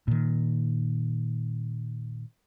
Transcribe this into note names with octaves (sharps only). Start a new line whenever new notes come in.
A#2 D#3